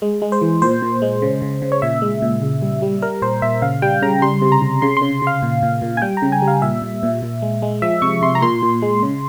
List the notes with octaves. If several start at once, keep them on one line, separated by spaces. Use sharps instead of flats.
G#3
G#3
C5
E3
A#2 C5
A#2
G#3
C#3
C#3
C#3
C#5
A#2 E5
G#3
A#2
C#3
G3
G3
G3 A#4
A#2 C5
A#2 E5
C#3 F5
G3 G5
C#3 A#5
G3 C6
C3
A#5
C3
C#3 C6
C6
C#3
C#3
F5
A#2
A#2
A#2
G#5
G3 G5
A#5
C#3
G#5
G3
F5
A#2 E5
A#2
A#2
A#2
G#3
G#3
F3 E5
C3 C#6
C3 C6
A#5
A#2 C6
A#2
G#3
C#3